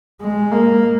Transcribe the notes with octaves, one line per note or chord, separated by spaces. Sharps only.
G#3
A#3